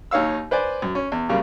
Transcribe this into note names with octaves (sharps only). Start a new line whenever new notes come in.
D#2 D#4 C#5 F5 E6
B4 C5 D5 G#5
F#2
C#4
E2
F#2 C#3 G3 A#3